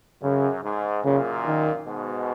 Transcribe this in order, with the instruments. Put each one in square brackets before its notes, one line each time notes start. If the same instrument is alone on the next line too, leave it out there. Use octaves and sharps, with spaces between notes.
[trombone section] F#2 [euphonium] C#3
[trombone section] G#2
[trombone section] F#2 A#2 [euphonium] C#3
[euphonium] D#3
[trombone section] G#2 B2